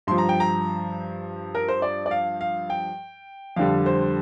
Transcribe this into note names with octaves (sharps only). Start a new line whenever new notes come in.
G2 F3 C6
A#5
G5
A#5
A#4
C5
D5
D5
F5
F5
G5
F2 D3 G3 F5
C5